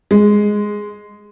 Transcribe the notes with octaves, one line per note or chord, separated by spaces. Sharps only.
G#3